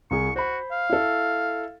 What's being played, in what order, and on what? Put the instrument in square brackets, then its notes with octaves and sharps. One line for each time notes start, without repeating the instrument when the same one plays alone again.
[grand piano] C2 E4 G#4 [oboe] C#6
[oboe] F#4 [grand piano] C5 B5
[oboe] F5
[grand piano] E4 A4